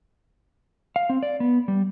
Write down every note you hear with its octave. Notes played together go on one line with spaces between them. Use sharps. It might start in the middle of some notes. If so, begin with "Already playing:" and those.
F5
C4
D5
B3
G3